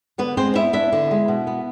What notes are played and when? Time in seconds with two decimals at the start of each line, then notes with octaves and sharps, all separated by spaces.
0.18 D3 B3 B4
0.37 G#3 C4 C5
0.55 B3 E4 E5
0.73 D4 E4 E5
0.92 D3
1.11 G#3
1.28 B2
1.47 B3